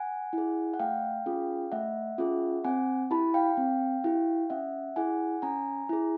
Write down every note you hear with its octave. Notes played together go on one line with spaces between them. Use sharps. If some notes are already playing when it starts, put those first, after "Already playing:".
Already playing: F#5 G#5
E4 G#4
F#5
A3 F5 G5
C#4 F4 G#4
A3 E5 F#5
C#4 F4 G#4
C4 F#5 G#5
E4 G4 A5 B5
F5 G5
C4
E4 G4
C#4 E5 F#5
E4 G#4 F#5 G#5
C#4 G#5 A#5
E4 G#4